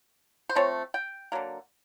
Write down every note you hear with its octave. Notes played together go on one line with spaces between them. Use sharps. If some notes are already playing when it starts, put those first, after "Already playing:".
C5
F3 A3 C4 C#5
G5
D3 F#3 A#3